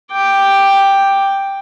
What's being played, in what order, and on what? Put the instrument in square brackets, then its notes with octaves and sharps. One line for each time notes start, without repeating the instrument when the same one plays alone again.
[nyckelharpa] G5 D6